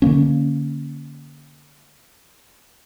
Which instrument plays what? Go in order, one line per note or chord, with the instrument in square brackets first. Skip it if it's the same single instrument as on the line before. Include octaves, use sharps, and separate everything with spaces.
[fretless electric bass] D3 F#3 A#3 C#4